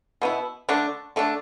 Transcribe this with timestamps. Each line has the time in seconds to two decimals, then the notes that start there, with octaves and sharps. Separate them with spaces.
0.22 B2 B3 E4
0.69 D3 A3 D4
1.16 D3 A3 D4